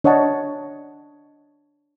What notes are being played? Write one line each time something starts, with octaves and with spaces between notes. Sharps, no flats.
D4 C#5 D#5 F#5 A5